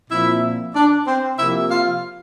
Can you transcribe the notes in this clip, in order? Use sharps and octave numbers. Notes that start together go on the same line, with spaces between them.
A#2 F3 C4 E4 E5
D4 D5
C4 C5
C3 F3 A#3 E4 E5
F4 F5